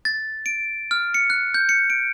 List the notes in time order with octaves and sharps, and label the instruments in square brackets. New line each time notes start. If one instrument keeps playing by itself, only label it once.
[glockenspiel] A6
D7
F6
C#7
F#6
G6
C#7
D7